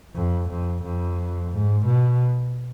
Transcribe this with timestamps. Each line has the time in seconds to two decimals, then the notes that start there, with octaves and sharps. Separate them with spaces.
0.15 F2
0.50 F2
0.83 F2
1.52 G#2
1.86 B2